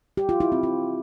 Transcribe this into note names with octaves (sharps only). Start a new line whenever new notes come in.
G4
F4
E4
C4
F4